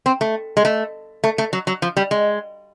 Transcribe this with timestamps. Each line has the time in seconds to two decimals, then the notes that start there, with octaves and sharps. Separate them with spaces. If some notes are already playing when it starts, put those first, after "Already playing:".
0.06 C4
0.21 A3
0.57 G#3
0.65 A3
1.24 A3
1.38 A3
1.53 F#3
1.67 F#3
1.82 F3
1.97 G3
2.11 G#3